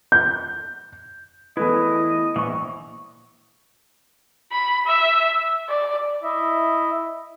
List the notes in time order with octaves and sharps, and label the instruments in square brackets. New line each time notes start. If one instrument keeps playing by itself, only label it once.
[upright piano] G6
[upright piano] E2 A3 B4 [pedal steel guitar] E4 [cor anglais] D#5
[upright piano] A#1 [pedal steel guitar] E3 C#6
[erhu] B5
E5
D5
[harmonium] E4 D#5 E5